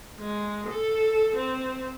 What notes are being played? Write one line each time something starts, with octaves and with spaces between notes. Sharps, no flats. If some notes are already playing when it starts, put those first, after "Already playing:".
G#3
A4
C4